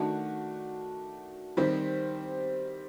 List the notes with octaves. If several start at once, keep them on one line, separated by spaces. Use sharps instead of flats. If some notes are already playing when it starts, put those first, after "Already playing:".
Already playing: D#3 A3 D4 F#4
D#3 G3 C4 G4